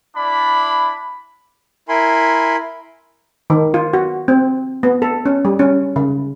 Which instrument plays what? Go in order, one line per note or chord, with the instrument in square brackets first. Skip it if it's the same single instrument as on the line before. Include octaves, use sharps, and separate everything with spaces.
[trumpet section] D4 E4 D5 B5
[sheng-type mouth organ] E4 A#4 G#5 B5 C6
[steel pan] D#3
F4
F#4
C4
B3
A4
C#4
G3
C#4
C#3